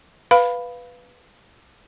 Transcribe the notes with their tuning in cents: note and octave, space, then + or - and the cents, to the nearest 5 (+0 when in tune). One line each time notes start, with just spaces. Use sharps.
B4 +0 F5 +0 B5 +0